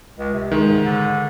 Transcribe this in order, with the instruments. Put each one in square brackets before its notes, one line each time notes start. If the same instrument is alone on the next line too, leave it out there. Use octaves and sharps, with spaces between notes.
[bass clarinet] C#2
C3
[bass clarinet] C#2 [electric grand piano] D#3 G#3
[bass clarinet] G#2
D3